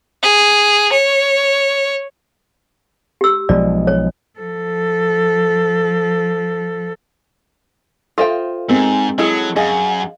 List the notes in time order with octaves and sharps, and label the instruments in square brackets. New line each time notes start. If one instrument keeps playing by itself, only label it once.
[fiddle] G#4
C#5
[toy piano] G4 E6
[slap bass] B1 F3 G#3 [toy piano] D5
[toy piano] C#5
[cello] F3 A4
[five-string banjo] F4 C5 G5 [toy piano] A4 E5 F5
[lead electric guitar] G#2 [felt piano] G#3 C4 [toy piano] A#4
[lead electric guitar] F#3 [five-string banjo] E4 G#4 A4 [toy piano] D#5
[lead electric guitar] F#2 [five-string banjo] G#4 [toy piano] D#5 F5